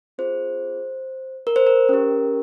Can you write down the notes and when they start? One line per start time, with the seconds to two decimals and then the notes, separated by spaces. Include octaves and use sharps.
0.18 C4 F4 G#4 C5
1.47 A#4
1.56 C5
1.67 A#4
1.89 C#4 G4